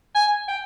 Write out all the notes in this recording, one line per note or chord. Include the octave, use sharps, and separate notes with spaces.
G#5
G5